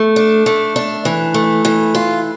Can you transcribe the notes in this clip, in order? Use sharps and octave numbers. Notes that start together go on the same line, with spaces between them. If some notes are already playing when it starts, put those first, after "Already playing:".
Already playing: A3
D4
A3
D4
E3
A3
E3
F4